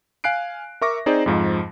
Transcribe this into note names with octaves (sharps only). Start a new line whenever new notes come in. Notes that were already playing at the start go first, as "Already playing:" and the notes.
F5 G#5 F#6 C7 D7
A#4 E5 C#6 D6 A#6
C4 D#4 G#4 C5 D5
F2 G#2 F3